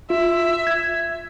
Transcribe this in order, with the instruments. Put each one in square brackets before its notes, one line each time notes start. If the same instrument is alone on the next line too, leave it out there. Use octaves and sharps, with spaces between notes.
[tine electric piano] F4 [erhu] E5
[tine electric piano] G#6